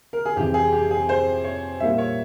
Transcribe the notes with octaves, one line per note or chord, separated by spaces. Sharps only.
A#4
G#4
F2 C3 E3 G4
G#4
G4
G#4
C5
C#5
A#2 G3 A#3 E4 E5
C#5